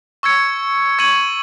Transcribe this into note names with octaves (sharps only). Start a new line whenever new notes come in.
C#6 E6 G#6 C#7
C#6 G#6 D#7 F#7